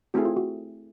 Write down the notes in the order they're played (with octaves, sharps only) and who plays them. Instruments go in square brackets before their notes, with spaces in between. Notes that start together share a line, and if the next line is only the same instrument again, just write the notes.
[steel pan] A3 C4 E4 G#4 [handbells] F#4
[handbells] F4
F#4